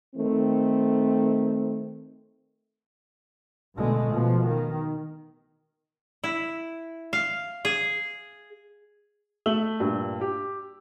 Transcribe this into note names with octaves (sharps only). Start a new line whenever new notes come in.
D#3 A3 C4
B2 D3 G#3 A3
B2 F3
D#3
E4
F5
G#4
A3 E5 E6 F#7 G7
G2 A#2
G4